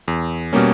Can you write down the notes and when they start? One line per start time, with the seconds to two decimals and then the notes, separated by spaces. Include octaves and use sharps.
0.08 E2
0.53 B2 G3 A#3 C#4